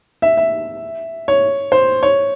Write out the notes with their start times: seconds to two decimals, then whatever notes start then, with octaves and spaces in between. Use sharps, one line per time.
0.22 E5
0.37 E5
1.28 C#5
1.72 C5
2.03 C#5